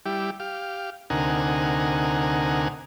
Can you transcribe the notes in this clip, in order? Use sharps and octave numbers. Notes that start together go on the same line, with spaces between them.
G3 E4 G4
G4 F5
D2 C3 D#4 A#4 F#5 G#5